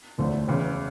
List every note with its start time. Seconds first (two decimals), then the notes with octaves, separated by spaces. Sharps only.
0.18 E1 D2 D3 F3 A3
0.47 E1 E2 C#3